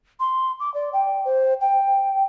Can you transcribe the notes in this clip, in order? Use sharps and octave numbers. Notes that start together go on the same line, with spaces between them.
C6
D6
D5
G5
C5
G5